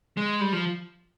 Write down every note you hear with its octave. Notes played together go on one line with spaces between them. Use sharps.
G#3
G3
F3